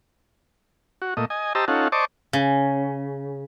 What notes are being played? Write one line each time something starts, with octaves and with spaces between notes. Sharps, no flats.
F#4
A#2 A3 D#5
D#5 G#5
G4 C5 D#5 A5 A#5 E6
C#4 D#4 F4 A4 F#5
C5 D5 D#5 A5 C#6 D6
C#3